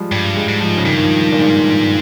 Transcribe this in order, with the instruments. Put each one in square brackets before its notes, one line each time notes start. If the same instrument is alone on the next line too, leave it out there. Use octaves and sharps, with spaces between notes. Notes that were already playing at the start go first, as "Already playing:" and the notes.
Already playing: [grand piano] F3 G3 G#3
[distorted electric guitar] G2 [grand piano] G3
[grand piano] G#3
[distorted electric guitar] G#2
[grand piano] F3
C#3
[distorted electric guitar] G2 [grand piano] D#3
[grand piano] D#3
F3
D#3
A#2
G#2